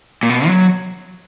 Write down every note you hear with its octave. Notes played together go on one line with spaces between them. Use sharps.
A#2
B2
F#3